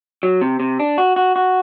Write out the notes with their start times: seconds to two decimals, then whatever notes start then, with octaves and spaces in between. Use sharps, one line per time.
0.23 F#3
0.41 C3
0.60 C3
0.80 D4
0.98 F#4
1.16 F#4
1.36 F#4